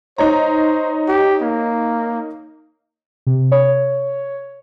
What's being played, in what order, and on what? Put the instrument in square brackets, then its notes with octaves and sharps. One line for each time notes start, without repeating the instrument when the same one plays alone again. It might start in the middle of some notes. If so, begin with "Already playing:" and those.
[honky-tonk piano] D#4 C#5 A#5 [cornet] C5
[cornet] G4
A#3
[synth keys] C3
C#5